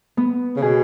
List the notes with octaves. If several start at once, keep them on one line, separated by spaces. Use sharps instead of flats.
B3
C#3
B2 G#4